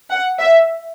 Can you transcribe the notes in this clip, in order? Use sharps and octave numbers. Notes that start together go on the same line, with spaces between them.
F#5
E5